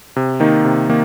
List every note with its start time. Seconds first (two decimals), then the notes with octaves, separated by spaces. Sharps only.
0.16 C3
0.40 D#3 A#3 D#4
0.65 C3
0.89 D#3 A#3